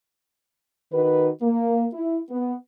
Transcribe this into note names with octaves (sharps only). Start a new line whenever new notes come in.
D#3 D#4 F#4 B4
A#3
E4
B3